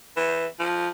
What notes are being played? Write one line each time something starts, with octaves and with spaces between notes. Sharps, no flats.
E3
F3